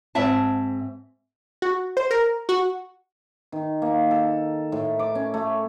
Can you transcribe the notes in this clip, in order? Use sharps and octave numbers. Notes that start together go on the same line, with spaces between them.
G#2 C4 E5 A5
F#4
C5
A#4
F#4
D#3
A#3
A4
A2
D6
C#4
A3